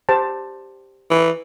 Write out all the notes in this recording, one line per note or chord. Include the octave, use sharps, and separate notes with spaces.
G4 C5 A5
E3